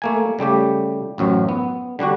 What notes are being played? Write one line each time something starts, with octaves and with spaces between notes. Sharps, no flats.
A3 A#3 G#5
C#3 G3 A3 G4
A1 F#2 F#3 C5
B3
D3 G3 D4 F#4